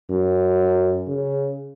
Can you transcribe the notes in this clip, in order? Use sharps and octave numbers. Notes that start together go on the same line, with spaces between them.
F#2
C#3